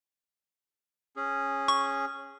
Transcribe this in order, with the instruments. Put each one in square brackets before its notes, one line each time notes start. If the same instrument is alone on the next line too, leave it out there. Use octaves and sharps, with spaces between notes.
[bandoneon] C#4 G#4
[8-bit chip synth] C#6